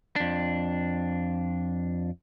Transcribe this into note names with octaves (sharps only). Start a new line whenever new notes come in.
F2 D4